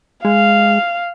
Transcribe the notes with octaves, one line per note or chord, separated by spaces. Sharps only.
G#3 F5